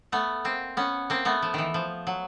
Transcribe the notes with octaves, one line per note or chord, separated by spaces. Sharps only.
A3 B3
A#3 C4
B3 C#4
A#3 C4
A3 B3
F3
D#3 E3
F3
F#3